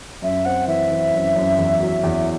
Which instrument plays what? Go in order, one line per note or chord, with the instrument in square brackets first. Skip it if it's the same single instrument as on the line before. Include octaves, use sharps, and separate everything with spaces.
[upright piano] F#2 [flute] E5
[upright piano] C4 [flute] F#5
[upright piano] E3 [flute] E5
[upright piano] E3
F#2
F#2
E2
F#3
E2